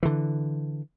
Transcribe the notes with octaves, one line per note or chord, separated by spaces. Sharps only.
D3 E3